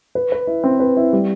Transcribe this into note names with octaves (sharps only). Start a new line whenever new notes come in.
B4
B4
E4
C4
B4
E4
G3